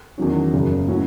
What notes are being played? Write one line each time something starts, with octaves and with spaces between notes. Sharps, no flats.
E2 D#3 F#3 C#4
F#1 F#2 C#3
A2 F#3 C#4